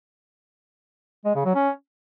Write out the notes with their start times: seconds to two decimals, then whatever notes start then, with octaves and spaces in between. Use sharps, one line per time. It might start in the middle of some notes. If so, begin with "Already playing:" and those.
1.25 G#3
1.35 C#3
1.45 F#3
1.55 C#4